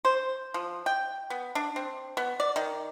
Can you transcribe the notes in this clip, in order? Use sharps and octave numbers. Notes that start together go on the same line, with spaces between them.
C5
F3
G5
B3
D4
C4
B3
D5
D#3